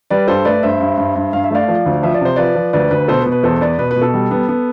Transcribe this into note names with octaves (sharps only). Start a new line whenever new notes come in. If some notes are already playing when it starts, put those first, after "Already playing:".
G3 B4 D5
G2 A4 C5
A3 B4 D5
G2 C5 E5
G2
G2
G2
G2 F5
E5
A3 D5 F5
F3
D2
F3 E5
D5
C3 C5
F3 B4 D5
F3
D2 B4 D5
D2 B4
B2 A4 C5
B4
B2
B4
E2 A4 C5
B3 B4 D5
B2 B4
B4
B2
A4
G3
B3
B3